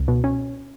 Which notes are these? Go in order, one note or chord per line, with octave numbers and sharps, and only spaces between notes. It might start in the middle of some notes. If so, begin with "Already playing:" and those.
Already playing: C#2
B2
C#4